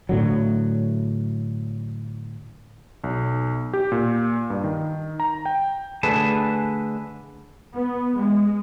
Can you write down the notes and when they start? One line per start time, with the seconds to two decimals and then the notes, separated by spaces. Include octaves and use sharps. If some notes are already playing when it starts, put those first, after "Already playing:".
0.09 A2 D3 F#3
3.04 B1
3.73 G4
3.92 A#2
4.50 G2
4.64 D#3
5.20 A#5
5.46 G5
6.03 D3 A3 G#4 B4 A5
7.75 B3
8.17 G#3